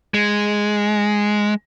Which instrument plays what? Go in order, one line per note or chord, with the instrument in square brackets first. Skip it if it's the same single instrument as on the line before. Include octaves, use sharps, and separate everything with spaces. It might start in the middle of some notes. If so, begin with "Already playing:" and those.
[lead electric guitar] G#3